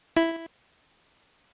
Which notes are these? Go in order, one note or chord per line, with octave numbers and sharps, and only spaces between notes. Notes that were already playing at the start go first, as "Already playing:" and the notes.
E4